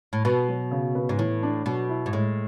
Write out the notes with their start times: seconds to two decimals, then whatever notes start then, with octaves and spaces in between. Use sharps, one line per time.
0.13 A2
0.25 B2 B4
0.49 F#3
0.71 C#3
0.95 B3
1.09 G#2
1.19 A2 E3
1.43 D4
1.66 B2 F#3
1.89 E4
2.06 G#2
2.13 A2 G#3